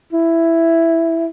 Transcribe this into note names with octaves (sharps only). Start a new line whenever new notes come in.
E4